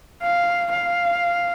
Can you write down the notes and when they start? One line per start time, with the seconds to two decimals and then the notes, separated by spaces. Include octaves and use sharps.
0.23 F5
0.73 F5